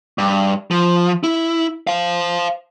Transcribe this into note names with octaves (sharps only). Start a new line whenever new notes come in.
G2
F3
E4
C5 F5